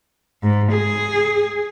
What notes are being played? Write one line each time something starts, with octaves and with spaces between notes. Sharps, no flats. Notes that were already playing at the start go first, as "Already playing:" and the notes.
G#2
G#4